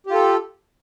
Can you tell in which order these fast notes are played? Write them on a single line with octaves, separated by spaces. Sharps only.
G4 F4 A4